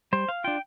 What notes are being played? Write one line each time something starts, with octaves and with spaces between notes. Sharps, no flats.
G3 C5
F5
D4 F4 G5